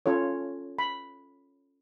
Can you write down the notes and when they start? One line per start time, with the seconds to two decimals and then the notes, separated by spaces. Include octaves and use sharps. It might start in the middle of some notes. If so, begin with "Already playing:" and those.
0.06 C#4 F4 A4 C#5
0.79 B5